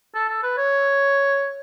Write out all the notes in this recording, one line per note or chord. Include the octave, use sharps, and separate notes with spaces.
A4
A4
B4
C#5